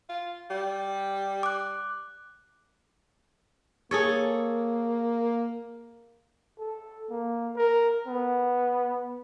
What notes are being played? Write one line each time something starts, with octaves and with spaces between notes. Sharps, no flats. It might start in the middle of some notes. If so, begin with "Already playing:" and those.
F4
G3
D6 F#6
A#3 G#4 A4 C#5
A4
A#3
A#4
B3